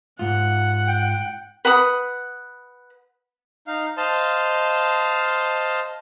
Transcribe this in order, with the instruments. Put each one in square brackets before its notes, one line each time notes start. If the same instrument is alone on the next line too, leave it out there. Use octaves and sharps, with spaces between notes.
[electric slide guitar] G#2 F4 [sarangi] F#5
[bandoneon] G5
[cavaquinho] B4 F#5 B5 D#6
[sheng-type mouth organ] D#4 F5
C5 D#5 F5 A5